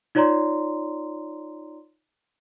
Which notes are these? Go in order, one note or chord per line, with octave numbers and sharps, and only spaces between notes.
D#4 F4 C#5 D5 A#5 C6